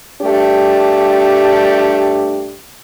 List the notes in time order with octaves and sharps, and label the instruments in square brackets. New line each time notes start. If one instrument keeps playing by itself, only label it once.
[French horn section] G2 A3 D4 G4